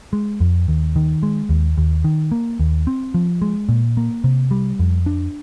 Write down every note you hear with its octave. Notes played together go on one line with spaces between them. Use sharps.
G#3
F2
D#2
D#3
G#3
D#2
D#2
D#3
A#3
D#2
C4
F3
G#3
A#2
A#3
C3
G3
F2
D4